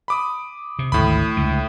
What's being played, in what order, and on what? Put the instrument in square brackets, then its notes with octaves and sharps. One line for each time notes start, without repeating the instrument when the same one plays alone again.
[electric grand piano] B5 D6 D#6
[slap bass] C3
[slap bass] G#1 D2 [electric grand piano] A2 B5
[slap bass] C#2 D3